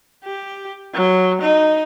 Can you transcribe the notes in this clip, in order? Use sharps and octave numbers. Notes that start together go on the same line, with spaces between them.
G4
F#3
D#4